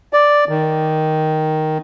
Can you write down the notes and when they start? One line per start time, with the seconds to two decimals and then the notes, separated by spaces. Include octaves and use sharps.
0.13 D5
0.49 D#3